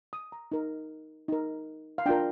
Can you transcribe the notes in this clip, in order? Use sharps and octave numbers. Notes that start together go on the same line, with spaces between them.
D#6
A#5
D#4 A#4
D#4 A#4
F5
D4 F4 A#4 G5